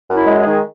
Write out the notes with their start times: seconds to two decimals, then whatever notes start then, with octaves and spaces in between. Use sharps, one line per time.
0.08 F#2
0.14 E4
0.27 G#3
0.40 G#4
0.46 D#3